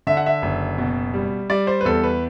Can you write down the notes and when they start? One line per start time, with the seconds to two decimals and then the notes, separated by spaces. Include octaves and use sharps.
0.07 D3 E5
0.17 F#5
0.26 E5
0.42 F#1
0.78 B2
1.14 G3
1.50 G3 D5
1.67 C5
1.81 B4
1.85 E2 A4
2.03 B4